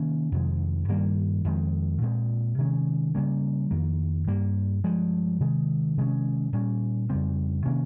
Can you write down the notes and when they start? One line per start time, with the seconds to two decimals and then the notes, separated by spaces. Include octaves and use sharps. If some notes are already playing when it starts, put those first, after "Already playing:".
Already playing: C3 D#3 A#3 C#4
0.32 F2 C3 D#3 G#3
0.88 G2 D#3 G3 A#3
1.44 F2 D#3 G#3 C4
2.01 A#2 G#3 C4
2.58 C3 D#3 G#3 C#4
3.15 C#3 G3 A#3 C#4
3.71 F2 D#3 A#3
4.27 G2 G3 A#3
4.84 G2 F3 G#3
5.40 C3 D#3 G#3
5.97 C3 D#3 G#3 C#4
6.53 A#2 G3 C#4
7.10 F2 C#3 G3 C4
7.66 C3 D#3 A#3 C#4